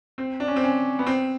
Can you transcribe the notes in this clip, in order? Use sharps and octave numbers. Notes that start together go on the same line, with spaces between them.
C4
D4
C#4
C4
C#4
B3
C4